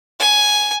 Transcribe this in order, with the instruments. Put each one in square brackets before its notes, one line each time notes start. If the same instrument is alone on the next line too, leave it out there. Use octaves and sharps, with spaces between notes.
[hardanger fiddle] G#5